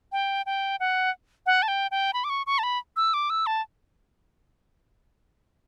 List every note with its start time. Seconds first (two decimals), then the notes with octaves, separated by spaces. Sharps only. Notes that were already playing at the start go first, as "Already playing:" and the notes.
0.12 G5
0.46 G5
0.80 F#5
1.46 F#5
1.63 A5
1.68 G5
1.91 G5
2.13 B5
2.24 D6
2.30 C#6
2.46 C#6
2.59 A5
2.63 B5
2.96 E6
3.14 D6
3.30 E6
3.46 A5